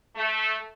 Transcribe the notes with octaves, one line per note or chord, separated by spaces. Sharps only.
A3